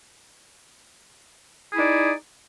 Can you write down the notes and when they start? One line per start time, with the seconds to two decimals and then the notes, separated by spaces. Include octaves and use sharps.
1.70 G#4
1.73 E4
1.76 D#4
1.79 D5